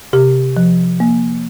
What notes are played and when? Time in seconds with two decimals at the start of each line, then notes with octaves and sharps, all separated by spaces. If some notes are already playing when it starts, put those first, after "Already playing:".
0.13 C3 G4
0.57 F3
1.00 A#3